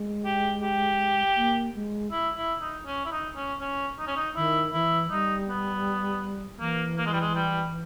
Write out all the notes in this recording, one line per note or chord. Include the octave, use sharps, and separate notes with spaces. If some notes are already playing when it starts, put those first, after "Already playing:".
Already playing: G#3
G4
G4
A#3
G#3
E4
E4
D#4
C#4
E4
D#4
C#4
C#4
D#4
C#4
D#4
D#3 E4
E3 E4
G3 D#4
B3
E3 A#3
A#3
G#3
G3
G#3
G3